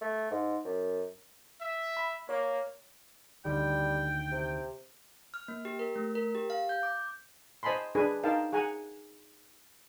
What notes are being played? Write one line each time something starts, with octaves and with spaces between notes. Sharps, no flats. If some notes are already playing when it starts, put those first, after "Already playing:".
A3
G#2
F#2
E5
B5
A#3 C#5
D2 D3 D#3 G3 G5
C3
F6
A#3
G4
A#4
A3
A#4
G4
F5
G6
D6
C5 D#5 G#5 A5 B5 C6
D4 G#4 B4 G#5
D#4 A#4 F5 G5 A5
G#4 F#5 G#5 A#5